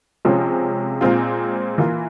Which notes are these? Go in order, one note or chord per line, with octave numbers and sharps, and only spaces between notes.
C3 F3 G#3 C#4 F4
A#2 G#3 C4 F4
E3 A#3 F4